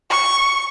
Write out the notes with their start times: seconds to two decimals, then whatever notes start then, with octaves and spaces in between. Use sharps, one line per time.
0.10 C#6